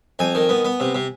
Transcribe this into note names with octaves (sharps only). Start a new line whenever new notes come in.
F2 G#5
D#3
B3
B3
C3
C3